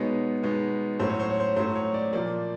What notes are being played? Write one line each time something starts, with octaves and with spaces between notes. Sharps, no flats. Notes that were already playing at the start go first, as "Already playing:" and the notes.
Already playing: B2 G#3 B3 D#4 C#5
B2 G#3 B3 D#4
A2 F#3 A3 C#4 C5
C#5
C5
C#5
C5
A2 F#3 A3 C#4 C5
C#5
D5
A#2 F3 A#3 D5